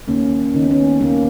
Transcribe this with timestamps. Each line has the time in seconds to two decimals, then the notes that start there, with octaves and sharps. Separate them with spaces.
0.08 D#2 A#3 C#4
0.54 D#3 C#4
0.63 B3
0.71 A#3 C#4
1.01 D#2 A#3 C#4